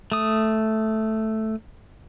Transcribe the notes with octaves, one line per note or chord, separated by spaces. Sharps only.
A3 D#6